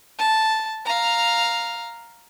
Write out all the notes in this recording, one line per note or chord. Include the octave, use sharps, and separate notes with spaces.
A5
F5 A#5